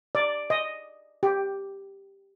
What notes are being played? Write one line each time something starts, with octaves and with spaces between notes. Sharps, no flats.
D5
D#5
G4